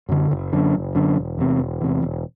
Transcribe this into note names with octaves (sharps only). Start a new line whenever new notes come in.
F#2 D3
F#1
F#2 D3
F#1
F#2 D3
E1
E2 C3
E1
E2 C3
E1